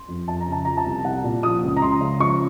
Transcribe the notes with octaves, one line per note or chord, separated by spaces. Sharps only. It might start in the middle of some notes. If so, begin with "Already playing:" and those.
Already playing: C6
F2
F2 A5
A#5
C#3
A5
F3 A#5
A5
C2
C2 F#5
A#2
F3 D#6
C#2
A#5
C#2 C6
C#3
F3 C#6